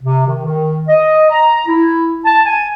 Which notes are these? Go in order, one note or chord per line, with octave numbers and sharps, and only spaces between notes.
C3
D#3
D#3
D#5
A#5
E4
A5
G#5